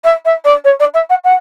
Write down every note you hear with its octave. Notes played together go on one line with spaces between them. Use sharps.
E5
E5
D5
C#5
D5
E5
F#5
F#5